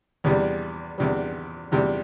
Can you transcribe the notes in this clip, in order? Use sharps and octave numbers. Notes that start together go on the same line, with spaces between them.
E2 C3 G3
E2 C3 G3
E2 C3 G3